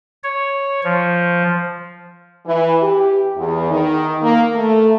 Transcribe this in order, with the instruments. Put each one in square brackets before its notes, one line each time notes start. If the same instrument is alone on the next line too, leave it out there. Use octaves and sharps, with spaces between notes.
[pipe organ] C#5
F3
[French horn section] E3
G4
E2
D#3
A#3
A3